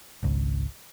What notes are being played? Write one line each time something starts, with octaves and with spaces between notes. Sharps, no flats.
G#1 C#2